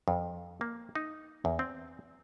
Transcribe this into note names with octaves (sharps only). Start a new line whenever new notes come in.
F2
A#3
D#4
E2
C4